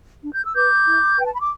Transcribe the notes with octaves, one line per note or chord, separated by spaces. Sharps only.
D4
G6
E6
B4 D6 G6
E4
B4 G5
A5
B5
D6